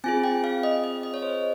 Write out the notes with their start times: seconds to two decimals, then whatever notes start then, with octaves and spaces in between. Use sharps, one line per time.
0.04 C4 F4 G#4 G#5
0.24 G5
0.44 F5
0.63 D#5
0.84 D#5
1.03 D#5
1.14 C#5
1.22 C5